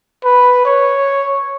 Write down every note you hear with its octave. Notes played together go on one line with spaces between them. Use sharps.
B4
C#5